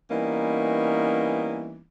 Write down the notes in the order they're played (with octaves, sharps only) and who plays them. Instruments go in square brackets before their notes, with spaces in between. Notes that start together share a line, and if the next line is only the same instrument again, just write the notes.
[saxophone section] E3 G3 A#3 B3 C#4 D#4